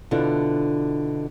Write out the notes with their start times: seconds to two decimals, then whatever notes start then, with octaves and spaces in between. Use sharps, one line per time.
0.11 B2 D3 D4 E4 F4